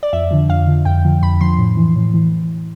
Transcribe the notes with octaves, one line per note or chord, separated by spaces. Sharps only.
D5
F2 E5
D3 F3
F2 F5
D3 F3
F2 G5
D3 F3
F2 B5
D3 F3 C6
A2
E3
A2
E3